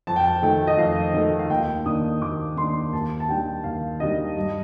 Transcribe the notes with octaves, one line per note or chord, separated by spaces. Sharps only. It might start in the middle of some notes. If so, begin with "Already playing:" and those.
F2 A5
G5
A5
D#3 A3 G5
D#5
F2 F5
D#3 A3 D#5
F5
D#2 G5
D#3 A#3 D4 D#6
D#2 D6
D#3 A#3 D4 C6
D#2 A5
A5
D#3 G3 D4 G5
D#2 F5
D#3 G3 D4 D#5
G2